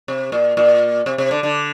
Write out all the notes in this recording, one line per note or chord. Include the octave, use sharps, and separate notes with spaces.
C3
A#2
A#2
C3
C3
D3
D3